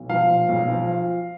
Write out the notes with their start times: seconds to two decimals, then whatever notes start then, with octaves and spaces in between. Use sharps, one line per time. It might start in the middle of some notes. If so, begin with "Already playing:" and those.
Already playing: B1
0.09 F3 F5
0.29 A#2
0.49 B1
0.68 F3